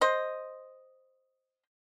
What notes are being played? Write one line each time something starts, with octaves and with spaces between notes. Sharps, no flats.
C5 D#5